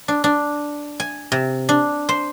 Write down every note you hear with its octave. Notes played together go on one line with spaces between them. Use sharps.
D4
D4
G#5
C3
D4
C5